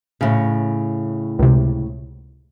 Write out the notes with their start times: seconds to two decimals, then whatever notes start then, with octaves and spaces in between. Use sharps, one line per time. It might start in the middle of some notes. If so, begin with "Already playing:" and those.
0.21 A2 C#3
1.39 C#2 C3